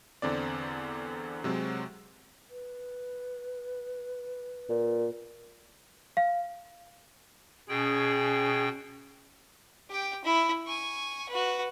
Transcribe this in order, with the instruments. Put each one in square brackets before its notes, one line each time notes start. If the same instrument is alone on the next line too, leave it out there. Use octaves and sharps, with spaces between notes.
[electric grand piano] E2 D3 C4 D5
C3 F#3 G#3 C4
[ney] B4
[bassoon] A#2
[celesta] F5
[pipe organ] B2 G5 [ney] C#4 [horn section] G#4
[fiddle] G4 G5
E4 B5
G#5 C#6
F#4 B4